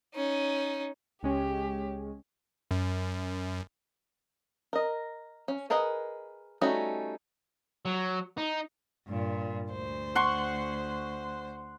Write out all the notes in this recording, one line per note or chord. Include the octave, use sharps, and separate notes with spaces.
C#4 D#4
C#2 G#3 C#4 G4
F#2
A#4 D#5
C#4
G#4 A#4 B4 D#5 F#5
G3 A3 C#4 D#4 F#4
F#3
D#4
G2 A#2
D2 C5
F#5 C6 C#6